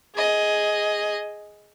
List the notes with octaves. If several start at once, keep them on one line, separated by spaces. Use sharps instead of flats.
G#4 D#5